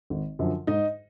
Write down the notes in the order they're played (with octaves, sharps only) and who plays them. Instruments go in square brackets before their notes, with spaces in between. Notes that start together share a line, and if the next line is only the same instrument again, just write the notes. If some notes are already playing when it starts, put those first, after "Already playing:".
[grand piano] G#1
F#2 D3 F3
G#2 D#4 D#5